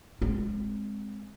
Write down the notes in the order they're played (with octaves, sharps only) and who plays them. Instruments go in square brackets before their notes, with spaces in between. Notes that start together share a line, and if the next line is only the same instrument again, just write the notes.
[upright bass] G#3 C4